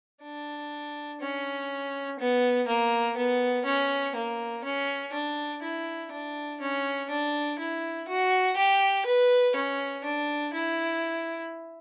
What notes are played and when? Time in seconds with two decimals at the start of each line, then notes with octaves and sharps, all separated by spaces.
0.23 D4
1.21 C#4
2.19 B3
2.68 A#3
3.17 B3
3.66 C#4
4.16 A#3
4.64 C#4
5.13 D4
5.62 E4
6.12 D4
6.60 C#4
7.10 D4
7.59 E4
8.08 F#4
8.57 G4
9.06 B4
9.56 C#4
10.04 D4
10.53 E4